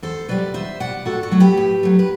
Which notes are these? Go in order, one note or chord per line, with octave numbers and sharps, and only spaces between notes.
E2 A4 C5
B2 G3 B4 D5
E2 C5 E5
B2 G3 D5 F#5
A2 F#4 A4
F#4 A4
F#3 A3
G4 B4
A2
F#3 A3
B4